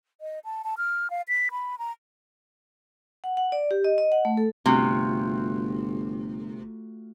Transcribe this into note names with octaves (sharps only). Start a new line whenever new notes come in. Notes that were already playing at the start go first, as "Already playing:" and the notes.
D#5
A5
A5
F6
F5
B6
B5
A#5
F#5
F#5
D5
G4
D#5
D#5
F#5
A3
A4
G1 C3 A3 F4 F#4